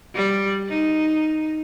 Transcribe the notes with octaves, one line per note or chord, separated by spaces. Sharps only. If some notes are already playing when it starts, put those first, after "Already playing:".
G3
D#4